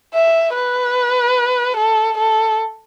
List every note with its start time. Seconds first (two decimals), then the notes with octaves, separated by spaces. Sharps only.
0.14 E5
0.54 B4
1.77 A4
2.18 A4